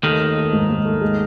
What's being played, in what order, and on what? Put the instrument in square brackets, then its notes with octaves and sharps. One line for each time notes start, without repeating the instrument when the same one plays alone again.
[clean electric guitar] D#2 D#3 [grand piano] A3
[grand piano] A3
A3
G#2
G#2
A3
G#3